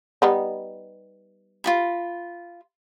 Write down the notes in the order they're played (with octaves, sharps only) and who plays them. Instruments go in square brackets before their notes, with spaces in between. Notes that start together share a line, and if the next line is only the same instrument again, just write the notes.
[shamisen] G3 B3 D#4
[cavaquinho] F4 F#4 B5